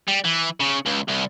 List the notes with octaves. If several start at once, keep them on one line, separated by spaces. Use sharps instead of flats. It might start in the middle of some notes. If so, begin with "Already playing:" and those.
G3
E3
C#3
C#2
C2